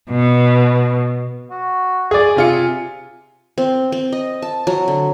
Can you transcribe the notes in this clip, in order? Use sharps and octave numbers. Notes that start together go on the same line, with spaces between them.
B2
F#4
G#4 D5 G#5
C3 F4 C#7
C4
C4
D#5
A5
F#3
D3